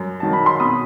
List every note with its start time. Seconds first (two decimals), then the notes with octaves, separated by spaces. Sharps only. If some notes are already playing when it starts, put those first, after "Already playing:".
Already playing: F#2
0.20 D#3 F#3 A5
0.33 B5
0.46 C6
0.60 B2 B5 D#6